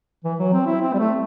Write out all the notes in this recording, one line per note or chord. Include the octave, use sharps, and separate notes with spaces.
E3
F#3
C4
E4
C4
G3
A3